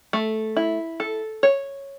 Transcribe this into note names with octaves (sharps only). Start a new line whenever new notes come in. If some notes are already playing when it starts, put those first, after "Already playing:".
A3
E4
A4
C#5